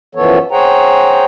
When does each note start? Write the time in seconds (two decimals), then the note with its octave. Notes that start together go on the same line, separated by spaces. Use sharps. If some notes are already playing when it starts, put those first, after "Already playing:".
0.15 F#2 E3 F3 B3 A4 C#5
0.51 G#4 C5 C#5 F#5 G5 A#5